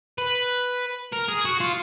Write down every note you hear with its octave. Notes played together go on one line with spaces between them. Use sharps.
B4
A#4
G#4
F#4
F4